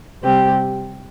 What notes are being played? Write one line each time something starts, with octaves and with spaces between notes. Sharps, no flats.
C3 G3 C4 G4